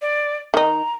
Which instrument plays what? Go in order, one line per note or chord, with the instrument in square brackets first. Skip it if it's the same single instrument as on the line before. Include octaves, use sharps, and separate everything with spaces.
[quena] D5
[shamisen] D#3 D#4 [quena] A#5